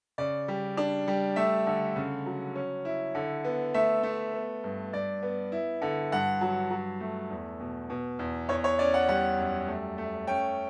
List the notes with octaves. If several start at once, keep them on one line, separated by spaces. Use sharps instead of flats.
C#3 D5
G3
D4
G3
A3 E5
D3
C#3
F#3
C#4
E4
D3
B3
A3 E5
A3
B3
G2
G2 D5
B3
E4
D3
G2 F#5
F#3
F#3
A3
E2
B2
B2
E2
E2 C#5
C#5
C#4 D5
F#5
G3 F#5
F#2
A3
A3
C#4 G5